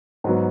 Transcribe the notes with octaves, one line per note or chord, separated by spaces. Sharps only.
G#2 F#3 B3